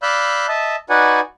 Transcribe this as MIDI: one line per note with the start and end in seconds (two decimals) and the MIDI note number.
0.02 0.46 74
0.02 0.46 77
0.02 0.46 83
0.02 0.46 88
0.02 0.46 90
0.02 0.46 91
0.48 0.76 75
0.48 0.76 76
0.48 0.76 81
0.90 1.20 63
0.90 1.20 66
0.90 1.20 71
0.90 1.20 74
0.90 1.20 78
0.90 1.20 80